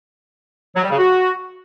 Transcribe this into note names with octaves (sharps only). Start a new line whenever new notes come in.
F#3
G3
C#3
F#4